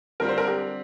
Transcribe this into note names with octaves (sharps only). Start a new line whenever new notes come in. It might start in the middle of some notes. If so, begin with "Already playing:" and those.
D3 G3 C4 F4 A#4
C5
A#4
G4